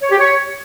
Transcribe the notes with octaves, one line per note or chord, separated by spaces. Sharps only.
C#5
G4
C#5